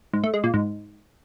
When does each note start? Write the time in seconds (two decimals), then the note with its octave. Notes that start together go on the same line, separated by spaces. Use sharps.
0.13 G#2
0.24 A3
0.34 G#3
0.44 A#2
0.54 G#2